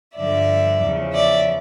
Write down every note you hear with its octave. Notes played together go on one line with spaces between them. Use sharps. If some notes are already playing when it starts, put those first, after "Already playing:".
G2 D3 F3 D5 E5
E2 C#3 F3
D5 E5